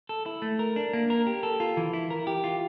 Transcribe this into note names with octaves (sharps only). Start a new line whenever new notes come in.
A4
E4
A3
A#4
D4
A#3
A#4
G4
A4
F4
E3
E4
A#4
G4
F4